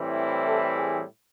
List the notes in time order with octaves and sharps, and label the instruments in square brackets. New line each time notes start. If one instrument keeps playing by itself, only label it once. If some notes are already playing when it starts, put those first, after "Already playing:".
Already playing: [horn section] A2 E3 G3 C4 E4
A4
G#4